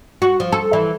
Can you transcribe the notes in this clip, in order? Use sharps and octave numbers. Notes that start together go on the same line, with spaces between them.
F#4
F3
A4
E3